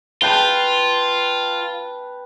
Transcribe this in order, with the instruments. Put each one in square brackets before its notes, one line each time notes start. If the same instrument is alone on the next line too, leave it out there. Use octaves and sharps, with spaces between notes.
[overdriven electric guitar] F4 [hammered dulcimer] B4 G5 A5